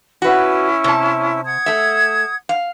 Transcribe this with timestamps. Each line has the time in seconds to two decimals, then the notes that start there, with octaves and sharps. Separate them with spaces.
0.22 C#4 E4 F#4 B4
0.84 C3 A5
1.45 F#5 D#6 G#6
1.66 A3 E5
2.49 F5